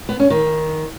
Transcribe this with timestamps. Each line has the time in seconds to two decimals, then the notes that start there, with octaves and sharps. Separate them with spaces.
0.09 B3
0.20 C#4
0.30 D#3